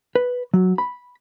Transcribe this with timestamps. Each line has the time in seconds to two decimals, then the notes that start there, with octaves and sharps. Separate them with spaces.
0.15 B4
0.54 F#3
0.78 B5